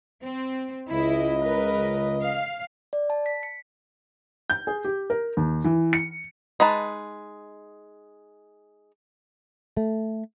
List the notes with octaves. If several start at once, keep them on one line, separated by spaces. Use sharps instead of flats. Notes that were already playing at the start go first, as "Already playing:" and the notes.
C4
C#2 E4 D#5
A#4 B4
F5
D5
A5
B6
C#7
G6
G#4
G4
A#4
D#2
E3
C#7
G#3 D#4 B4 A5
A3